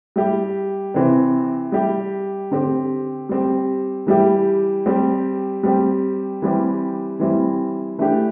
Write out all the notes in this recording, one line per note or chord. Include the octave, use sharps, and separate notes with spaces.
G3 E4 G4
C3 E3 C4
G3 E4 G4
D3 C4 G4
G3 C4 G4
E3 G3 E4 G4
G3 C4 G4
G3 C4 G4
E3 G3 C4 G4
E3 G3 C4 E4
E3 A3 D4 G4